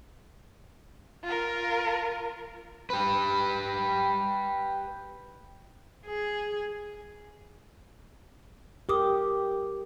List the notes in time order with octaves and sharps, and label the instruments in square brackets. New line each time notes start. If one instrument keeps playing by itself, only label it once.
[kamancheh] F4 A#4
[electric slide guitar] G4 B4
[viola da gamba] G#4
[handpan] G4 [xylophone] A#4 D6 D#6